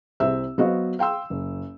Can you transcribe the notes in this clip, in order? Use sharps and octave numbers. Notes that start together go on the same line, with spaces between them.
C2 C4 E5 E6
F#3 B3 F#4 C5 D#5 F5
F5 G5 C6 E6
F#1